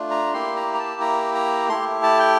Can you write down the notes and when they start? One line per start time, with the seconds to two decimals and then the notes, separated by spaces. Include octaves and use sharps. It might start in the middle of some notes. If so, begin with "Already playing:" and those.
Already playing: A3 D4 F4
0.11 A#5
0.34 A#3 E4 G4 C6
0.56 A#5
0.74 A#5
0.79 A5
1.01 A#5
1.35 A#5
1.69 A3 E4 G4 C6
2.03 A5
2.20 G5